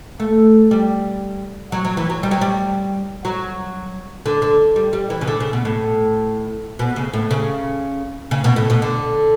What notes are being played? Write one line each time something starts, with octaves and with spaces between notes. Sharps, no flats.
A3
G3
F#3
F#3
E3
F#3
G3
F#3
G3
F#3
D3
D3
G3
G3
E3
C#3
D3
C#3
B2
A2
B2
C#3
A2
C#3
C#3
B2
A2
B2
D3